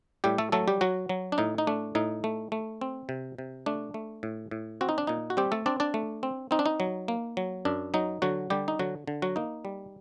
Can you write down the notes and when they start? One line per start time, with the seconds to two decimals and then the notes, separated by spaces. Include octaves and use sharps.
0.24 A2 G3 G4
0.38 A3 A4
0.52 F#3 A3 A4
0.68 G3 G4
0.81 F#3 F#4
1.09 F#3
1.32 D4
1.38 A2 D#4
1.58 D#4
1.67 A3 D4
1.95 A2 D#4
2.24 A3
2.52 A3
2.81 C4
3.09 C3
3.38 C3
3.66 A3 D4
3.94 A3
4.23 A2
4.51 A2
4.81 C4 F#4
4.89 D#4
4.98 D4
5.07 A#2 D#4
5.30 F#4
5.37 G3 C4 G4
5.52 A3 A4
5.66 C4 D4 D5
5.80 D4 D5
5.94 A3
6.23 C4
6.51 C4 D#4
6.59 D4
6.66 D#4
6.80 F#3
7.08 A#3
7.37 F#3
7.65 F#2 D4
7.94 F#3 D#4
8.22 D3 F#3 F#4
8.50 D3 G3 G4
8.68 D#4
8.79 D3 F#3 F#4
9.07 D3
9.22 F#3 F#4
9.36 A#3 D#4
9.65 G3